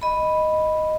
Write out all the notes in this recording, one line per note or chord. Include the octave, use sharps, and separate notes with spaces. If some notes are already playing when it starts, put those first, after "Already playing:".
D#5 B5